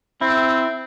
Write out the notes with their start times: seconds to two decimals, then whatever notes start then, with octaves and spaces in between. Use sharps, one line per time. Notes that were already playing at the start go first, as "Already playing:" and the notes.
0.21 C4 E4